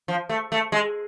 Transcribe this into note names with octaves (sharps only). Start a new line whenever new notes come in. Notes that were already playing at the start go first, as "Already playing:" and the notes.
F3
A3
A3
G#3